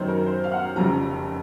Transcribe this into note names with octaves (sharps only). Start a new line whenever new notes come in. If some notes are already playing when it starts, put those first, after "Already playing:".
Already playing: F#2 D#3 F#3 C#4 C5
A#4
C5
F5
F#5
F1 F2 C#3 F3 A#5